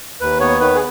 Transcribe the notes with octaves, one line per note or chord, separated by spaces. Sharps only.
D#2 B4
B3 C#5
D#3 B4
G#4